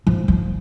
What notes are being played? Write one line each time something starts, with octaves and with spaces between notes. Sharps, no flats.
F3
F3